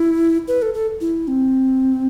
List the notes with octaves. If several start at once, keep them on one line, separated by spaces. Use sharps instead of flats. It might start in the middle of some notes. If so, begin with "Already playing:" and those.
Already playing: E4
B4
A4
A4
E4
C4